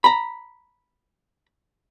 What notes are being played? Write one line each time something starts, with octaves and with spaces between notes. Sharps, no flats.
A#5 B5